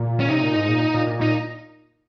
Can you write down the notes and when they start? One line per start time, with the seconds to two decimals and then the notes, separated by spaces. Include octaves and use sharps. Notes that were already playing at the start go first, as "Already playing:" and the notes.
Already playing: A#2
0.20 C#4
0.29 C3 D#4
0.42 A#2
0.55 G#2
0.68 A#2
0.94 A#2
1.07 A#2
1.19 A#2 D#4